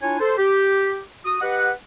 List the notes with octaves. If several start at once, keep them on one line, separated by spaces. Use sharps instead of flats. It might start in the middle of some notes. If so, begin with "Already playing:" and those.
D4 E4 F4 C#5 G#5
A4 C5
G4
F#4 D#6
G4 B4 D#5 F#5